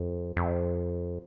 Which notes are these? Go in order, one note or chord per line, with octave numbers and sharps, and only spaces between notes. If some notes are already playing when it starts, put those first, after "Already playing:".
Already playing: F2
F2